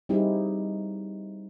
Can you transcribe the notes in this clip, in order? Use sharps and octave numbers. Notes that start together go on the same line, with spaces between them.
G3 C4 D#4 E4 G4 G#4